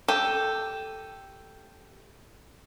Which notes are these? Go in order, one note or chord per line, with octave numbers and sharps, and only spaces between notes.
G4 A4 G6 D#7